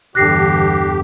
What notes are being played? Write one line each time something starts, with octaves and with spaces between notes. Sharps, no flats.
E2 G2 D3 G4 F#6 A#6 C7